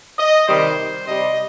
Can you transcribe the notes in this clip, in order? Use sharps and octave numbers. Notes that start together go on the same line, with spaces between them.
D#5
C3 D#3 G3 C5
C3 G3 D#5